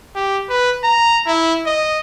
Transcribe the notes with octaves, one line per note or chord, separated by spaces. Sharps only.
G4
B4
A#5
E4
D#5